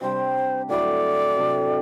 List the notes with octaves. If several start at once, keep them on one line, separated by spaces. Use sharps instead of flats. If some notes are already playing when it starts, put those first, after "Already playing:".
C3 G3 D4 G4 C5
A2 F#3 C4 E4 D5
C3 F#3 A3 D4